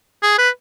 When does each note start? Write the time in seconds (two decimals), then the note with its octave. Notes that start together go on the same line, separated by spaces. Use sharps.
0.23 G#4
0.38 B4